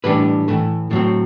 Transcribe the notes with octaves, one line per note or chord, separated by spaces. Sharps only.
A2 E3 G3 D4 B4
A2 E3 A3
A2 F#3 C4